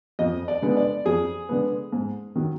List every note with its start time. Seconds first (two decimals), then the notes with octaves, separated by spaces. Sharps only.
0.19 F2 D#5
0.48 D5
0.62 D3 G#3 B3
0.77 D5
1.05 F2 G#4
1.49 D3 G#3 B3
1.92 G#2
2.35 D#3 F#3